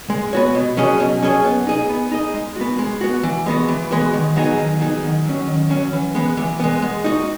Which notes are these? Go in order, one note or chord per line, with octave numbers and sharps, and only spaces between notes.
G#3
B3 F#4 C#5
B2
F#3 C#4 G#4 D#5
B2
F#3 C#4 G#4 D#5
B3
D#4 G#4 D#5
B3
D#4 G#4 D#5
G#3
B3 F#4
G#3
B3 F#4
E3
G#3 B3 F#4
E3
G#3 B3 F#4
D#3
F#3 B3 D#4 G#4
D#3
F#3 B3 D#4 G#4
D#3
F#3 C#4
D#3
F#3 C#4
E3
G#3 B3
E3
G#3 B3
G#3
D#4 F#4